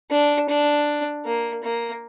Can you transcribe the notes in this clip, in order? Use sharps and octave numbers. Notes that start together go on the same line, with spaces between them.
D4
D4
A#3
A#3